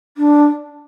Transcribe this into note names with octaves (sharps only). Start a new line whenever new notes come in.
D4